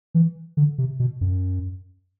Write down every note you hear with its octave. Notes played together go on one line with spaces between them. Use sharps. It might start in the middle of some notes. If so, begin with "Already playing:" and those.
E3
D3
C3
B2
F#2